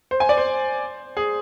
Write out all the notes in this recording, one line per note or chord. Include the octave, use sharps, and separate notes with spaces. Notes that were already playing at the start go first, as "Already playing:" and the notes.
C5
G#5
D5
C5
G#4